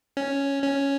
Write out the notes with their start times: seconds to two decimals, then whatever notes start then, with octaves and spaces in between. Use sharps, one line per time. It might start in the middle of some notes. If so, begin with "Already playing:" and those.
0.17 C#4
0.63 C#4